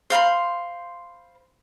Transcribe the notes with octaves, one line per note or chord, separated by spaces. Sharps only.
C5 F5 B5 C6